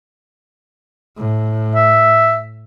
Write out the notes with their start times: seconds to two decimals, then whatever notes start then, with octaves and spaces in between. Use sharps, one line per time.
1.17 A2
1.75 E5